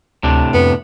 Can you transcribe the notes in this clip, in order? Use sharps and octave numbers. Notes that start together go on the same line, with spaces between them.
D2 A2 C3 D4
F2 B3